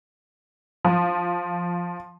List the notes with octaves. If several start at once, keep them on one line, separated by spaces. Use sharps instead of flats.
F3